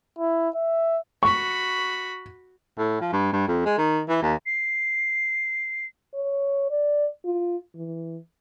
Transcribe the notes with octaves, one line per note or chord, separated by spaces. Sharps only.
E4
E5
F#4 B5 C#6
A2
F3
G2
G2
F2
G#3
D#3
E3
D#2
C7
C#5
D5
F4
E3